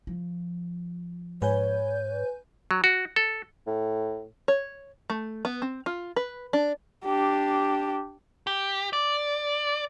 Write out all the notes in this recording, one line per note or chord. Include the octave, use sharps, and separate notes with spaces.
F3
G#2 B4 C#5 G#5 G6
F#3
F#4
A4
A2
C#5
A3
B3
C4
F4
B4
D4
D4 G4
G4
D5